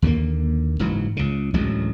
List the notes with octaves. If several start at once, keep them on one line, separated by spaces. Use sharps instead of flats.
D#2 D3 F3 A#3
F#1 G#2 E3 F#3
C#2 C#3
A1 D2 F#3 G#3